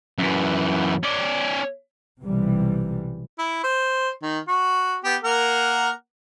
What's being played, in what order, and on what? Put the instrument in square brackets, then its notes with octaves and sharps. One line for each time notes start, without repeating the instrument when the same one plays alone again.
[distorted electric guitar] F#2 E3
C#4 D5
[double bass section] B1 C3 E3 G3
[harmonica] E4
C5
D#3
F#4
B3 G4
A#3 A#4 F#5